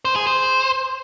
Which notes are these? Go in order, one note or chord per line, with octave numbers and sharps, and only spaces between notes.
C5
G#4
C5